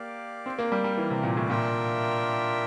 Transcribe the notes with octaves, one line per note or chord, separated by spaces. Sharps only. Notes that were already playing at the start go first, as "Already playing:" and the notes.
Already playing: A#3 G4 D5 F5
C4
A#3
G3
G3
E3
C3
A#2
A2
A#2 D4 F4 A#4 E5 G5